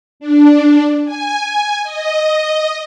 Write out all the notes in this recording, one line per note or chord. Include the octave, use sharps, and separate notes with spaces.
D4
G#5
D#5